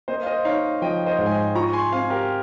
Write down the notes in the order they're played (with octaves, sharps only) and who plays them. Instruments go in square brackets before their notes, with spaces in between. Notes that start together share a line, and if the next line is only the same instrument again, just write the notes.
[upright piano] A#3 [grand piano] C5 D#5
[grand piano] F5
C5 D#5
[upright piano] D#4 [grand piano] C#5 F5
[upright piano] F3 [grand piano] D#5 G5
[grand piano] C5 D#5
[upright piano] G#2
[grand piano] G#5
D#5 G5
[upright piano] F4 [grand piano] A#5 C#6
[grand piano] C#6
G#5 C6
[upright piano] C4 [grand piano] F5 G#5
[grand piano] G4 A#4